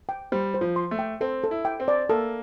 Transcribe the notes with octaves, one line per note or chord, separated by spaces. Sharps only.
G5
G3 C5
C5
F3
C6
A3
G5
C4 A4
A4
E4
G5
C4
D5
A#3 A4